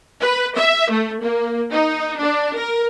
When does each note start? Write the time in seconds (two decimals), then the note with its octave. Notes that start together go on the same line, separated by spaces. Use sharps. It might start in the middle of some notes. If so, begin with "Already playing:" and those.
0.20 B4
0.57 E5
0.91 A3
1.21 A#3
1.71 D#4
2.18 D4
2.56 A#4